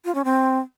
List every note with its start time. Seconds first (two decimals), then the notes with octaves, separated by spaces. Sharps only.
0.05 F4
0.15 C#4
0.25 C4